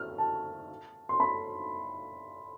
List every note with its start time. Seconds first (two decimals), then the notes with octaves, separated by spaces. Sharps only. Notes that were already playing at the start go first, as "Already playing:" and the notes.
Already playing: F6
0.18 A5
1.09 C6
1.20 B5